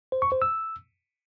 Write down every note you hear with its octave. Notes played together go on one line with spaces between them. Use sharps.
C5
C#6
C5
E6